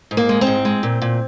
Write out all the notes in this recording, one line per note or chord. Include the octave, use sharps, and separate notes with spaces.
G#2
A#3
G#3
C4
G#2
G#3
A#2
A#2